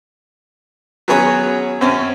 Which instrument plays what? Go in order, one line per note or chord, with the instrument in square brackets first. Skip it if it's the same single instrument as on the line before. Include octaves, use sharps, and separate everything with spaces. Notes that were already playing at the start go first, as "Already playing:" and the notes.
[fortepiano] F#3 B3 C#4 G#4 C#5
F#2 C4 C#4